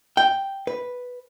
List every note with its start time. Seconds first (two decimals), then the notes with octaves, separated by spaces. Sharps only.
0.17 G5
0.67 B4